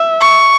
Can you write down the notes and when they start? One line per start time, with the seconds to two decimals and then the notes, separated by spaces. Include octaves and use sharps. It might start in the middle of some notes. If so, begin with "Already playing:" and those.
Already playing: E5
0.20 C#6